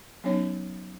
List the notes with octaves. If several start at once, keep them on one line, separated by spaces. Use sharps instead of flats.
F#3 B3 C#4 D#4 C#5